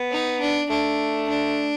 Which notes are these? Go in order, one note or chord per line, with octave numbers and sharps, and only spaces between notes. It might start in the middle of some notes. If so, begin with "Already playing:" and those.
Already playing: B3
D#4
D4
A3 D4
D4